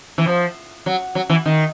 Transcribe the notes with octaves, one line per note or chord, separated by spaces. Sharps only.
E3
F3
F#3
F#3
E3
D#3